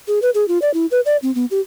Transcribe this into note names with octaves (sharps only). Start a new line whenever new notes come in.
G#4
B4
G#4
F4
D5
E4
B4
D5
C4
B3
G4